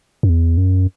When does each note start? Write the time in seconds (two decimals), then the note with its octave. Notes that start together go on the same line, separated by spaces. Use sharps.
0.23 F#2
0.29 E2
0.57 F#2